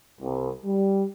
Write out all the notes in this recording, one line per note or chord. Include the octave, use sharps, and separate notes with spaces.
C2
G3